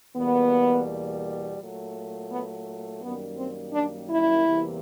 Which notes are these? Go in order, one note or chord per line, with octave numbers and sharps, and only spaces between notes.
E2 B2 G3 A#3 B3
A#2 F#3 A3
B3
F#2 D#3 G3 A#3 B3
C4
D4
E4
E2 C3 E3 G3 A#3